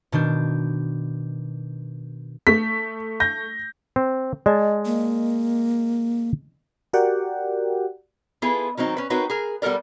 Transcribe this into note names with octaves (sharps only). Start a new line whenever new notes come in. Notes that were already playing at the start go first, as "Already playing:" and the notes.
B2 D#3 D4 G6
A3 B6
G6 A#6
C4
G#3 D5 D#5 A5
A#3
F#4 G4 A#4 D5 F#5 G5
B3 E4 F4 G#4 A4 B4
D#3 F#3 C4 D#4
C#4 B4
C4 D#4 F#4 A#4 B4 C#5
G#4 A#4
G3 B3 A4 A#4 D5